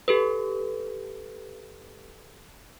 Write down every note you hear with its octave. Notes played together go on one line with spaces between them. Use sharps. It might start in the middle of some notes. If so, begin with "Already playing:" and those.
G4 A4 B4